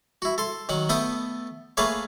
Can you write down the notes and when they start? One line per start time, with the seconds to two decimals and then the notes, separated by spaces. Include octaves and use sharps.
0.22 E4 F#4
0.38 A4 C6
0.69 D#3 F#3 F#5
0.89 A3 B3 A4 G5 D#6
1.77 A3 A#3 G#4 B4 C#5 F5